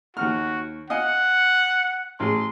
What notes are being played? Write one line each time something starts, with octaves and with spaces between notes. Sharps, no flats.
D#2 F#4 F#5 F6
D#5 F5 F#5 G#5
A1 G#4 C6